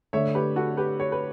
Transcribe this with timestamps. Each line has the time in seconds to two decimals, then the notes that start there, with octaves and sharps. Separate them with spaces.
0.13 D3 A3 D4 C#5 E5
0.35 G4 B4
0.56 F#4 A4
0.77 G4 B4
1.00 C#5
1.12 B4